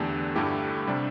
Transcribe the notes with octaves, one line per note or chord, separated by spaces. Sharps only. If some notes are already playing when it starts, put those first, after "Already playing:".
Already playing: E2 D3 A3 D4 G4
G2 D3 A3 E4 G4
C3 G3 D4